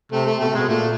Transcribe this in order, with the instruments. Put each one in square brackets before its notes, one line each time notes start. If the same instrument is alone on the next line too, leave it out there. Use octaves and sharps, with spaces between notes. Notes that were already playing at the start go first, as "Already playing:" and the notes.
[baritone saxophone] C3 [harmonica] A3
[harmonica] A3
[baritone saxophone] B2 [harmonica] A3
[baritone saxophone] C3
[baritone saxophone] B2 [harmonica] G#3
[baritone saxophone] A#2 [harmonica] A3